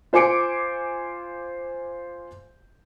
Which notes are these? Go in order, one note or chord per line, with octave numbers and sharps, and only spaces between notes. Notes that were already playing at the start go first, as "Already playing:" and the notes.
F4 C5 G#5 D6 C#7 D7